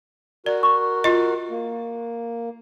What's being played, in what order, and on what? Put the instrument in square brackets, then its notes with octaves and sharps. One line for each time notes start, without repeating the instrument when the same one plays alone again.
[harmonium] F#4 A#4 [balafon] D5
[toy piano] C#6
[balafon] F4 D#5
[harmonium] A#3